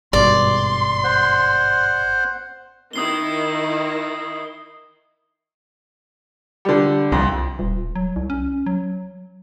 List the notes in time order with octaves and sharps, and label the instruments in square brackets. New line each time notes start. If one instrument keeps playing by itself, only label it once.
[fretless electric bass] G#1 G2 B2 [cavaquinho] D5 [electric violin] C6
[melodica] C5 F#5
[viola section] D#3 E4 [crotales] D#6 C7 G7
[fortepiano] D3 G3
[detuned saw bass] C2 [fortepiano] F2
[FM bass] D#1
F#3
C2
C#4
F#3